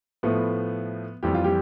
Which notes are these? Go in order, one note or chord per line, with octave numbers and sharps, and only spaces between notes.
A2 F3 A3 B3
F2 E3 G3 G4
F4
G3 G4